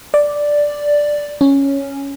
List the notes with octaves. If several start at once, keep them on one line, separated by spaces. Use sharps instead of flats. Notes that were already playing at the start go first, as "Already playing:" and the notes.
D5
C#4